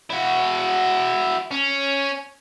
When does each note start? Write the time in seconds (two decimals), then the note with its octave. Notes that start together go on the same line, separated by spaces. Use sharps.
0.10 E4 F#4
1.51 C#4